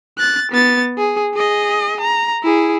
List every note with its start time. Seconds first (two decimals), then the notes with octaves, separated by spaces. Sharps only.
0.18 F#6 A6
0.52 B3 A6
0.98 G#4
1.34 G#4 D#5
2.00 A#5
2.44 E4 G#4